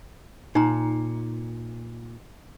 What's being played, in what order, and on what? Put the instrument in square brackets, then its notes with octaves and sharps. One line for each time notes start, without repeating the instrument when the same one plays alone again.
[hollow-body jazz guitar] A#2 [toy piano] D#4 A#5